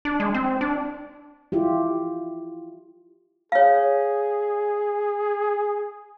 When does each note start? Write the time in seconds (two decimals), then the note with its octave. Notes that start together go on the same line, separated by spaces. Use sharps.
0.05 D4
0.20 G#3
0.34 C4
0.61 D4
1.52 E4 F4 G4
3.52 G#4 C#5 F5